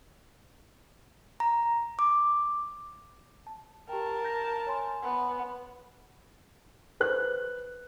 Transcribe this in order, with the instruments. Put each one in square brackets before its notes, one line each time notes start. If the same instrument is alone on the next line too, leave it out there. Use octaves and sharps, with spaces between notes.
[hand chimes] A#5
D6
[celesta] A5
[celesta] G4 G5 [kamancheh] A#4 A5
[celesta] G6 A#6
C#5 G#5 C6
[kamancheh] B3
[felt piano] B4 C5 F#6